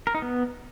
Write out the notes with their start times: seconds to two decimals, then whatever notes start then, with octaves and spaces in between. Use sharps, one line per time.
0.07 A#4
0.15 D#4
0.22 B3